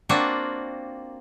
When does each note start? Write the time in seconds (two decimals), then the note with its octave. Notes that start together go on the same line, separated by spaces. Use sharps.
0.09 A#3 C4 D4 F4 F#4